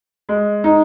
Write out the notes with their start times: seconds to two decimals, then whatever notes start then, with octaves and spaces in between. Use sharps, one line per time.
0.29 G#3
0.64 D#4